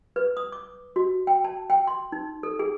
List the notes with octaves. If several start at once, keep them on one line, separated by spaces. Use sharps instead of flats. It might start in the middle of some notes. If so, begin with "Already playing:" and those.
B4
D#6
D6
F#4
G5
A5
G5
C6
D#4
A4
G#4